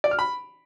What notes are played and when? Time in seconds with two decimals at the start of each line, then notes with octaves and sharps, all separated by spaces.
0.04 D5
0.11 F6
0.19 B5